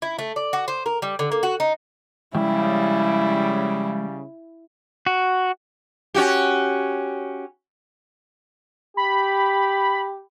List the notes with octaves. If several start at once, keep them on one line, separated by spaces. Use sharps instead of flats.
E4
A3
D5
F#4
C5
A#4
G3
D3
A#3
F#4
D#4
C#3 F3 G3 G#3 E4 G5
F#4
C#4 F#4 G4
G4 B5